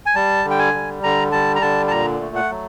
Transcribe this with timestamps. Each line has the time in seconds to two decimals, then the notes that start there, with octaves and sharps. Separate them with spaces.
0.06 G#5
0.15 G3 A5
0.44 D3
0.51 G5
0.59 G#5
0.73 G3
1.03 D3 A#5
1.32 G3 A5
1.56 A#5
1.61 D3 A5
1.88 A5
1.91 A#2 A#5
2.20 A3
2.35 F#5
2.50 F#3